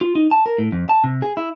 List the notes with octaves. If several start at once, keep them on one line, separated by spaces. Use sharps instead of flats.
F4
D#4
A5
A#4
A2
F2
A5
C3
G#4
E4